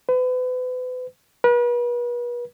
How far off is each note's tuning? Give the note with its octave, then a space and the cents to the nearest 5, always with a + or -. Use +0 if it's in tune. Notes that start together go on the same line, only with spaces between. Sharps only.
B4 +35
B4 -40